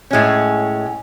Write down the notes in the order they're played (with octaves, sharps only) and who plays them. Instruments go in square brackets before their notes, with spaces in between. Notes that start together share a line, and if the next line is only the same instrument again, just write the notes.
[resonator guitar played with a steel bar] A2 G#3 C#4